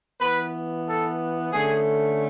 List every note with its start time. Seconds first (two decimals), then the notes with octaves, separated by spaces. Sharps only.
0.20 E3 B3 B4
0.87 A4
1.53 D3 A3 C#4 G#4